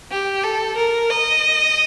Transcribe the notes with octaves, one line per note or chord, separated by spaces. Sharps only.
G4
A4
A#4
D#5